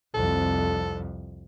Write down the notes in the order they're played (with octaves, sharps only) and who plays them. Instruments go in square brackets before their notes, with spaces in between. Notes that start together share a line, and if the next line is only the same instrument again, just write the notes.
[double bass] C2 F2 [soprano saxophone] A4